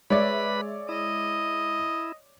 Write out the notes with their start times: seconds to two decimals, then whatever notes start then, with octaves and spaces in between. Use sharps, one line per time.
0.10 G#3 B4 C#5 D5 E5 B5
0.89 E4 D#5